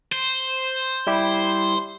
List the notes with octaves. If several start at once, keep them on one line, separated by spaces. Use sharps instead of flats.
C5
G3 E4 G4